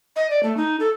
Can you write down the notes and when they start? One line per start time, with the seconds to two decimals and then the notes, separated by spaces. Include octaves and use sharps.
0.16 D#5
0.30 D5
0.43 A3
0.57 D#4
0.80 A4